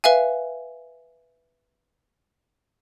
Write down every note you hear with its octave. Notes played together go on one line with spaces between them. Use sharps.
B4 E5 F5 G#5